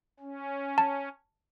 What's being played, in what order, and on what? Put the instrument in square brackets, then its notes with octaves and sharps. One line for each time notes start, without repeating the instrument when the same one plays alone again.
[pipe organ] C#4
[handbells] A5